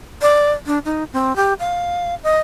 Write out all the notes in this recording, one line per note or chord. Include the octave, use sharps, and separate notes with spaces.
D5
D4
D#4
C4
G4
F5
D#5